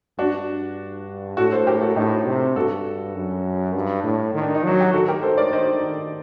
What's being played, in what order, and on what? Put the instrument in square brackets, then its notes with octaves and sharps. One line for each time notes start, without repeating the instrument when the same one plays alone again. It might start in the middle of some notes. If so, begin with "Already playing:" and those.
[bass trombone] G2 [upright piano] D4 F#4
[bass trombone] A2 [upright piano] F#4 A4
[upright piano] A4 C5
G4 A#4
F#4 A4
[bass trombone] A2 [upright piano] D#4 G4
[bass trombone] C3
[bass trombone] G2 [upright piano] F#4 A4
[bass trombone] F#2
G2
A2
D#3
[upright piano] D4
D#4
[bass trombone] F#3 [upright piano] F#4
[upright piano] G4
[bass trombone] D#3 [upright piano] F#4 A4
[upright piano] G4 A#4
A4 C5
A#4 D5
C5 D#5